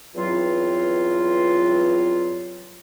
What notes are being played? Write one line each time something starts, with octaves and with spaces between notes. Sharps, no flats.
E2 G2 F#3 C4 F4